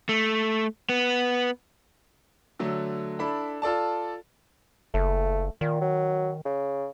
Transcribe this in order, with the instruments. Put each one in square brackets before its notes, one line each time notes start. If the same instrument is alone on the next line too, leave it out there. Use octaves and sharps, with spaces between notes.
[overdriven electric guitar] A3
B3
[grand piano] D3 F#3 A3
D4 E4 A4 B5
F4 A4 D5 A5
[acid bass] F#1 [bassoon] A3
[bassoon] A#2 [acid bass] D#3
[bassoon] F#3
C#3